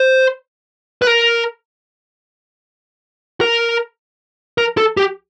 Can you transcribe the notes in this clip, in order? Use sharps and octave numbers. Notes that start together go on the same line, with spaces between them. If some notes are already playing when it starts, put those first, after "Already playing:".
Already playing: C5
B4
A#4
A#4
A#4
A4
G4